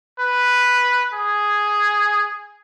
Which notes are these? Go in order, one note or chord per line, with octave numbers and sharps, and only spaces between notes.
B4
G#4